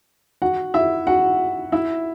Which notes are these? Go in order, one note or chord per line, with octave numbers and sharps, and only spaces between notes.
F#4 F#5
E4 E5
F#4 F#5
E4 E5